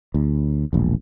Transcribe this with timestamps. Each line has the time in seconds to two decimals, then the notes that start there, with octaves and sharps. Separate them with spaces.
0.14 D2
0.73 E1 A#1